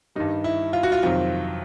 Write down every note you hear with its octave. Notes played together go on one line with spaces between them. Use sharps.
G2 D#3 G3 D#4
E4
F4
F#4
F4
F2 C3 D#3 F#3 F4